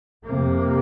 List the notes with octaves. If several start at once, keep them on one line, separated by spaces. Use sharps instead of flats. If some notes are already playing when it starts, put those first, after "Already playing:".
F2 C3 A#3